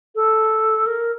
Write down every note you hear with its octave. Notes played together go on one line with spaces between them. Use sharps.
A4
A#4